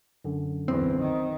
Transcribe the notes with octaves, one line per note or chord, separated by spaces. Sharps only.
F#2 D3
B1 E2 C4
D#3